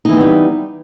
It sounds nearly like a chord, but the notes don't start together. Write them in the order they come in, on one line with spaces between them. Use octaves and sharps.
D#4 E3 C4 B3 G3